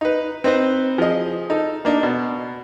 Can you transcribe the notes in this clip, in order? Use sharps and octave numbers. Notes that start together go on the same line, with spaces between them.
D#4 B4
C4 D#4 B4 C5
F3 G#4 D#5
D#4 A4
A#3 D4 D#4
B2